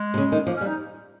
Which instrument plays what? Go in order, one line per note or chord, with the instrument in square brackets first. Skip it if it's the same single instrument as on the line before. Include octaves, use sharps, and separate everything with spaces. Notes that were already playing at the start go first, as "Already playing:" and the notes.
Already playing: [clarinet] G#3
[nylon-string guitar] C3
C#3
D#3
[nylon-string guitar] F3 [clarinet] A#3
[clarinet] C#4
[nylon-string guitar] G3
[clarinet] D#4